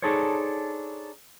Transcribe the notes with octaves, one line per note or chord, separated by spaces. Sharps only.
D4 D#4 G#4 A4 C5 C#5